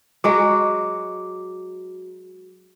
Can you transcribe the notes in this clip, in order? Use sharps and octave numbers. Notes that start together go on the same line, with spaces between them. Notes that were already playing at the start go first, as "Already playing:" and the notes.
F#3 G#3 F#4 D6